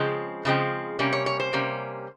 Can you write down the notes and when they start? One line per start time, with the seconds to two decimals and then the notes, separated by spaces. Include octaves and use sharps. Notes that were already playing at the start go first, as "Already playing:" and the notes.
Already playing: C#3 F3 G#3 C4
0.45 C#3 F3 G#3 C4
0.99 C3 G3 A#3 C#4
1.13 C#5
1.26 C#5
1.40 C5
1.53 C3 G3 A#3 C#4